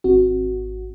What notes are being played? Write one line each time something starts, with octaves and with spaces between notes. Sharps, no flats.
G#1 C4 F#4